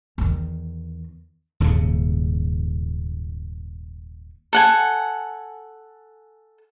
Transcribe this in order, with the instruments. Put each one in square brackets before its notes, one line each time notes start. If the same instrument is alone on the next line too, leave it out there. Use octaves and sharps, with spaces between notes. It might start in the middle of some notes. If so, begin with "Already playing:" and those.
[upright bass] E2 D#3
[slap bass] D#1 D#2 G#2 C#3
[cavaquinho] A4 F#5 G#5